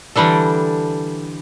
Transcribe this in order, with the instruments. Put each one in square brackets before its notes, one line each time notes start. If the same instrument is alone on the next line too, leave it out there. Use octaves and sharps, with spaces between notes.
[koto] D3 E3 G3 D4 A4